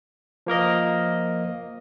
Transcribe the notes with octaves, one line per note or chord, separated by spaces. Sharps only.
F3 A#3 A#4 D#5